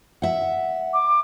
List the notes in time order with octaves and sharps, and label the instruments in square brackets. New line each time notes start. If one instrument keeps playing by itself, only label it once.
[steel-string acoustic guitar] E5 F#5
[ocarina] D6